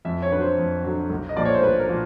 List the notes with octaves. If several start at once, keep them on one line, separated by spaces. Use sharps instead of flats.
F2 E5
C#5
D3 B4
F#3 C5
F2
D3 F#3
B1
D#5
A#2 F3 A#3 D5
C#5
C5
B1 B4
A#4
A#2 F3 A#3